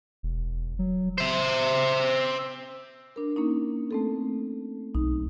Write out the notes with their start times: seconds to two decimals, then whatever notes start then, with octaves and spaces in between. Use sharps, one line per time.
0.23 E1
0.79 F#3
1.18 C5 E5
3.16 D4 A#4
3.36 A#3 C#4 D#4
3.91 A3 C4 A4
4.95 B1 D#4